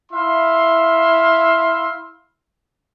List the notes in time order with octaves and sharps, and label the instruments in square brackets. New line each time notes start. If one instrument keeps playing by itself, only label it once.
[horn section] E4 E5 F5 C6